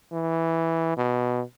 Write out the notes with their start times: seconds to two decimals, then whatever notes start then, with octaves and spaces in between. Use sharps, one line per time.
0.12 E3
0.97 B2